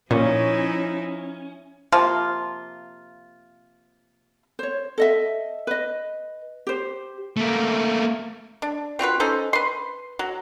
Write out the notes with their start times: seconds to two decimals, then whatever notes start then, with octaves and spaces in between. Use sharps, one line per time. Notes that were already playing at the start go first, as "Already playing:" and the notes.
0.11 A#2 F3 C#4 D#4 E4
1.92 C3 F3 A#3 F4
4.59 C5 C#5
4.98 A4 D#5 E5
5.67 B4 D#5
6.67 G4 C5
7.37 A3 A#3
8.62 D4
8.99 C4 F4 F#4 B4
9.20 C#4 D#4 A4 C5
9.53 B4 C6
10.19 F#3